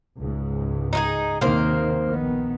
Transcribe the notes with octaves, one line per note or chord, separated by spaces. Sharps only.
C#2 G#2
D#4 F4 G#4
D#2 C3 D#3 A#3 C5
A#1 D#3 B3